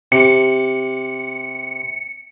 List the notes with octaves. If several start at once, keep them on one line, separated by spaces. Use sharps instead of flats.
C3 C#7